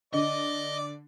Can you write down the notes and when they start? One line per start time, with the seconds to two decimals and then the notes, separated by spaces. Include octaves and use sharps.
0.14 D3 D5 D#5 D6